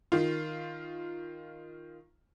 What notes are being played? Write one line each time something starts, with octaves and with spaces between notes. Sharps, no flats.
D#3 F4